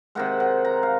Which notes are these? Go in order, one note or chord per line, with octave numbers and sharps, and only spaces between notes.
C3 D#3 G#3 F#5
F#5
A#5
F5